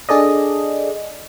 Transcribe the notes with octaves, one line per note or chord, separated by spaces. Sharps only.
D4 G#4 A4 D5 D#5